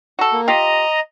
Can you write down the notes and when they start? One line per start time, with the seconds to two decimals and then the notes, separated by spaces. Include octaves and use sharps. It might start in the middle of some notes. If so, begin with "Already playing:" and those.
0.19 F#4 A4
0.32 A#3
0.48 F4 G4 D#5 A#5